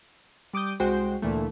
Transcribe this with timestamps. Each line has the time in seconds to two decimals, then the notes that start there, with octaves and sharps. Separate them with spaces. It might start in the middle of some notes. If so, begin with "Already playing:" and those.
0.53 G3 D6 D#6 G6
0.80 C2 G#3 F#4 C5 G5
1.22 D2 A#2 E3 A3